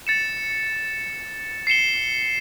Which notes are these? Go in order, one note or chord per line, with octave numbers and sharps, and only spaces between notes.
A6 C#7 E7
C7 C#7 E7 G7